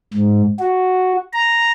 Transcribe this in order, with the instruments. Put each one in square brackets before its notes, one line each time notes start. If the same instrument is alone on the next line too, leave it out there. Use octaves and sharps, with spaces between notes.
[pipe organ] G#2
F#4
A#5